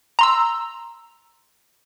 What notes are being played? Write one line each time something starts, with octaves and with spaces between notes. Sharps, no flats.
A#5 C6 E6